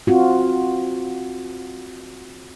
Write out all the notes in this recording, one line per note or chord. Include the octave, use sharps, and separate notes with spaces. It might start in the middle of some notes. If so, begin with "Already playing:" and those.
C4 F4 F#4